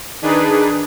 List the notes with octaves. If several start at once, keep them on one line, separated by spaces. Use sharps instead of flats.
D#3 D4 D#4 G#4 B4